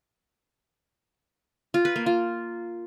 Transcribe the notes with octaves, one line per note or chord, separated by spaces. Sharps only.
F4
B4
A#3
F4